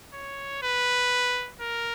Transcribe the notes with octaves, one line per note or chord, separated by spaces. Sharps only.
C#5
B4
A#4